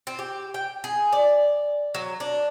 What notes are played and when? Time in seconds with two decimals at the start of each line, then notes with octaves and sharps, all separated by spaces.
0.07 C4
0.19 G4
0.54 G5
0.84 G#4
1.12 D5
1.94 F#3
2.20 D4